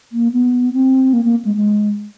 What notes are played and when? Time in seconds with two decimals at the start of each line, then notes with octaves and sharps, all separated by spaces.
0.12 A#3
0.32 B3
0.73 C4
1.13 A#3
1.24 A#3
1.45 G#3
1.55 G#3